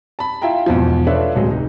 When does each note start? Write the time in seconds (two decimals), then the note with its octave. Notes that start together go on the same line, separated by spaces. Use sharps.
0.19 A5 B5
0.42 E4 F4 E5 F5 G5 A#5
0.66 E2 G#2 B2 F3
1.07 D4 F4 A4 B4 C#5 E5
1.36 D1 F#3 G#3
1.50 F1 D#4